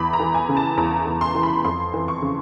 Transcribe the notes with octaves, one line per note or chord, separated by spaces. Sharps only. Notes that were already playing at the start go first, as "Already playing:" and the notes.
Already playing: E2 B5
A#5
E3
G#5
C#3
A5
E2 A#5
E2
C6
E3
B5
F2 C6
E3
C#6
C#3